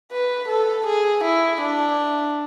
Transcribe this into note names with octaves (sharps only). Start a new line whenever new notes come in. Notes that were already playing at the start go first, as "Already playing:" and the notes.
B4
A4
G#4
E4
D4